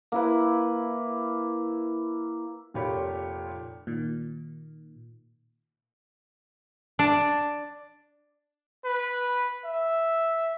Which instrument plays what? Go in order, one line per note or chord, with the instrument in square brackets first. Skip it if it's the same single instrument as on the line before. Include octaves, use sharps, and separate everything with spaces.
[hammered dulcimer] A#3 E4 B4
[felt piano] F1 A#2 F4 G4 C#5 B5
[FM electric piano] A#2 D#3
[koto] D4
[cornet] B4
E5